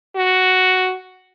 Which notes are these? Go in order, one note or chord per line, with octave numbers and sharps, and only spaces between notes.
F#4